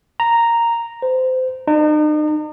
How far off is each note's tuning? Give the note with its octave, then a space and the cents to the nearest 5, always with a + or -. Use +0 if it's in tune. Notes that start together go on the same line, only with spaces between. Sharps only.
A#5 -5
C5 -25
D#4 -40